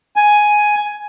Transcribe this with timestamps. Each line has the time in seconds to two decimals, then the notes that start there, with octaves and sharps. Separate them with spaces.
0.16 G#5